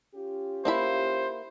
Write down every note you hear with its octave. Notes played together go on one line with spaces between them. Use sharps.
C#4 F4 G4
A#3 E4 C5 B5